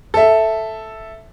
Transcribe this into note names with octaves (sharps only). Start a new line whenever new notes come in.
A4 E5